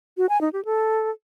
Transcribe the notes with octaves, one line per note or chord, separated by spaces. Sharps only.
F#4
G#5
D#4
G4
A4